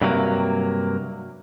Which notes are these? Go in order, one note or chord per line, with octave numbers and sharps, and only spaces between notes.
G2 C3 F#3 A3 A#3